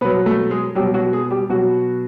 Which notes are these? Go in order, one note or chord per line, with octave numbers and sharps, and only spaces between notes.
B2 F#3 B3 B4
A3 A4
G#3 G#4
B2 F#3 G3 G4
F#3 F#4
G#3 G#4
G3 G4
B2 F#3 F#4